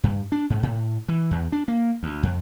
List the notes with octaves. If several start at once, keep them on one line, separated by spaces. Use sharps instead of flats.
G2
D4
G#2
A2
E3
E2
D4
A#3
D2
F2